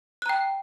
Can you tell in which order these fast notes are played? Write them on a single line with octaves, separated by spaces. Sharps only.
F#6 A#5 G5